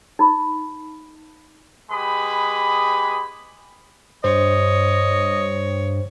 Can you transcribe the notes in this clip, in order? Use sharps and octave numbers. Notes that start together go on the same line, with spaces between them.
D#4 B5 D6
G#3 G4 B4 B5 D#6
G2 C5 C#5 D#5